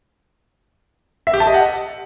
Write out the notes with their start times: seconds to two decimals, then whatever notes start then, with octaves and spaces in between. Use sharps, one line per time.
1.27 E5
1.34 G4
1.40 A5
1.47 D#5
1.54 F#5